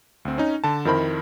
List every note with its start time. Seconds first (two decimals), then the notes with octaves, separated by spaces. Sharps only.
0.25 D2 C4
0.38 C#4 D#4
0.64 D3 A5
0.85 F2 D#3 E4 A#4 C5 B5